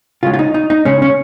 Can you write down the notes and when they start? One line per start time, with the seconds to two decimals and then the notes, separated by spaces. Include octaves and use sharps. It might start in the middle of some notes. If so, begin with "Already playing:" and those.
0.23 C#3 G#3 F4
0.34 F4
0.39 D#4
0.54 D#4
0.70 D#4
0.85 C#3 G#3 C#4
1.02 C#4